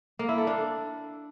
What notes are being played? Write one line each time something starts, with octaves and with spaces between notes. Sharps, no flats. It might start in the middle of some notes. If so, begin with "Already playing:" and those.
A#3
E4
A4
D4